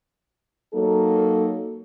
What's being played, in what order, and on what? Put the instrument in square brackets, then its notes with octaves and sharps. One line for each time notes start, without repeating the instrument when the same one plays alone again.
[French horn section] F#3 A#3 D#4 A4